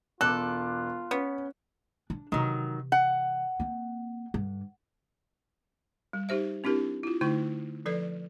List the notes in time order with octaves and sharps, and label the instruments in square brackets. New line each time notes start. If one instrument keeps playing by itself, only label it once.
[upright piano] E1 D6 [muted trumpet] F4 [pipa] A4 [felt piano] F#6
[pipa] B3 [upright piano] C#4
[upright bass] D4
[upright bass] C3 E3 [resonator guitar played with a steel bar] D#3 F#3
[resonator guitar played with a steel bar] F#5
[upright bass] A#3 C4
G2 D3
[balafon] G3
D#4 G4 C5 E5
C4 D4 E4 G4 A#4
E4 F4
D3 A3 D#4 E4 C#6
F3 A4 B4 D5